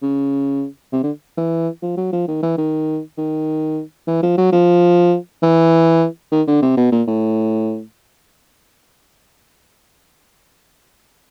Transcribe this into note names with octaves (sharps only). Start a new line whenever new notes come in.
C#3
C3
D3
E3
F3
F#3
F3
D#3
E3
D#3
D#3
E3
F3
F#3
F3
E3
D#3
D3
C3
B2
A#2
A2